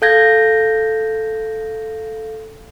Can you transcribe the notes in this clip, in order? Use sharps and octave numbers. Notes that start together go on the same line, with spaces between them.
A4 F5 G6 G#6 A#6